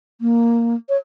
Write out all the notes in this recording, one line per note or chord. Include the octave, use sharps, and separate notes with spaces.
A#3
C#5